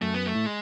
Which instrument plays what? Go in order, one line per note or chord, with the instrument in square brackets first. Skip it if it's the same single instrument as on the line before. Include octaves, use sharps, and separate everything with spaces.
[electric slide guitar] F#2 [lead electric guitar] A3
[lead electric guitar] B3
A3
[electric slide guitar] A2
[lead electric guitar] G#3